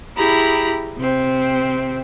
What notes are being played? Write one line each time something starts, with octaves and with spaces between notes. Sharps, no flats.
E4 G4 G#4 A#5 B5
C3 C4